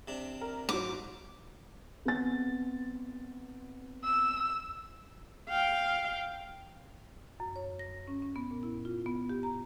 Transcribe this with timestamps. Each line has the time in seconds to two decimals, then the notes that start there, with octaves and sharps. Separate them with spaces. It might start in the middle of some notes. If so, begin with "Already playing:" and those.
0.08 C3 D4
0.41 A#4
0.69 G#2 F#3 D6
2.05 B3 C4 A6
4.04 E6
5.49 F5 G5
7.40 F#2
7.56 C#5
7.79 A#6
8.08 C#4
8.22 C#4
8.36 B3
8.51 A#2
8.63 E4
8.85 F4
9.06 B3
9.30 G4
9.43 A#5